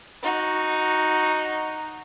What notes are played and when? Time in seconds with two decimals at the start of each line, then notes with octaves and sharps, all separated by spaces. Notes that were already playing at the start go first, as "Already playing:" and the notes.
0.22 D#4 F#4